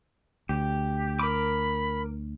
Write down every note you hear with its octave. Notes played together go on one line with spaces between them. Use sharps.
D2 G4
A#4 B5 D6